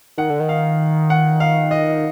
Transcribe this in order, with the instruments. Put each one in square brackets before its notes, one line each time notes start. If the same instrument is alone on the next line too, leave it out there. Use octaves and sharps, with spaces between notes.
[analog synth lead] D#3 [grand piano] F#5
[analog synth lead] D3
D#3
[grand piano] F5
F#5
F5
D#5